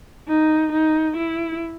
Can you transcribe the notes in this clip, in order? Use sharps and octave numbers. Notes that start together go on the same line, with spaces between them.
D#4
D#4
E4